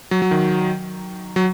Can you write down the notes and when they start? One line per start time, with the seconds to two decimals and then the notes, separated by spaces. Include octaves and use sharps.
0.11 F#3
0.22 F#3
0.31 D#3
1.36 F#3